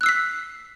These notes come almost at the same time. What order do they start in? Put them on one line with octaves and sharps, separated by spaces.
F#6 E6 C7 B6